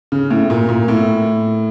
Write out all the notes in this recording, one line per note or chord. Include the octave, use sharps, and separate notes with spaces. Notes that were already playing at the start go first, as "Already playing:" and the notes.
C#3
A2
A#2
A#2
A2